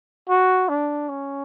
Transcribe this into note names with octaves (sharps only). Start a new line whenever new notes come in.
F#4
D4
C#4